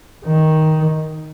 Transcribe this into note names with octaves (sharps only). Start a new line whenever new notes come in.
D#3